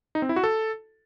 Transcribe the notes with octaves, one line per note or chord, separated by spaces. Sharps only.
D#4
C4
E4
F#4
A4